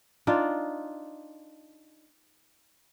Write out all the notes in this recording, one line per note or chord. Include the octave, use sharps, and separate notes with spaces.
D4 D#4 F4 D5